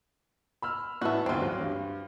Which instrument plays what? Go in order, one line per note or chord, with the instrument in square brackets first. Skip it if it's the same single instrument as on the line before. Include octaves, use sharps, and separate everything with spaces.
[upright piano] B5 E6 F6
[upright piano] A2 B3 A5 [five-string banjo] F#4 E5
[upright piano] G1 D2 [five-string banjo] C4 F4
[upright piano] F#3
G2